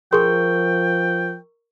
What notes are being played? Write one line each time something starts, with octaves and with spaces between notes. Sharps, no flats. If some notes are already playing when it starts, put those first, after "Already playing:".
F3 G#4 A#4 G5 C6 C#6